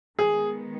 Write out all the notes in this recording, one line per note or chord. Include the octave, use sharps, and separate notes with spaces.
D#3 G#3 B3 G#4